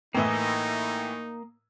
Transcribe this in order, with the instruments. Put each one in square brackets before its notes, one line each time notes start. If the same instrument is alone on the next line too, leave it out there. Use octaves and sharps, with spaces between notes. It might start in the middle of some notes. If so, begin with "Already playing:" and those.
[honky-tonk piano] A2 E3 E4 [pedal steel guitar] A#3 D#5 [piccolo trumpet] D#4